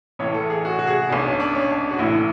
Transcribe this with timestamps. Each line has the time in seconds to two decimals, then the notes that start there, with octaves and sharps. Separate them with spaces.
0.19 A1 A2 E3 C#5
0.34 A4
0.50 G#4
0.65 F#4
0.79 F#4
0.87 G#4
1.09 B1 B2 D4
1.25 C#4
1.40 D4
1.55 C#4
1.70 D4
1.91 F#4
1.99 A1 A2 E3 E4